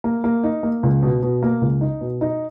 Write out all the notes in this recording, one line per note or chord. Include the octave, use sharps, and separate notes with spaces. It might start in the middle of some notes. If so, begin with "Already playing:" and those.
A#3
A#3
D#4
A#3
C#2
B2
B2
A#3
C#2
D#4
B2
D#4